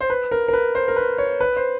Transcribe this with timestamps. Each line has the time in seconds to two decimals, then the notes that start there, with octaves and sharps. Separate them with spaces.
0.01 C5
0.10 B4
0.31 A#4
0.48 A#4
0.53 B4
0.75 C5
0.88 A#4
0.96 B4
1.18 C#5
1.40 B4
1.56 C5